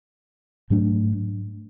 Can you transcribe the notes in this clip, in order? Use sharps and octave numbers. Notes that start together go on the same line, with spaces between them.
G#2 F#3 A3 D4